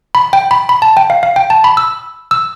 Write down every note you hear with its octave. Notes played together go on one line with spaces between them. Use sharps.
B5
G5
B5
B5
A5
G5
F5
F5
G5
A5
B5
E6
E6